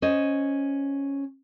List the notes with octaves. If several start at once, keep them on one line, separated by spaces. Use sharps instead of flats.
C#4 C5 D#5